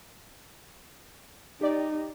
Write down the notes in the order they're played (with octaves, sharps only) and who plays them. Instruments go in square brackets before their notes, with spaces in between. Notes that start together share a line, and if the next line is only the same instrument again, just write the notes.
[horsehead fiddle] D#4 [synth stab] G4 D5